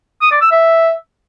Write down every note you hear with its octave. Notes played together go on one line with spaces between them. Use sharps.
D#6
D5
E6
E5